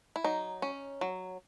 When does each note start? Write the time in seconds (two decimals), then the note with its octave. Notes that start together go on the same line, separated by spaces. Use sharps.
0.16 E4
0.24 F#3 D#4
0.62 C#4
1.01 F#3